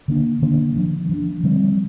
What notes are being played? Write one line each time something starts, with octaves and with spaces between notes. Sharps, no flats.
D3 A#3 D4
D3 A#3 D4
F3 D4
F3 D4
D3 G3 C4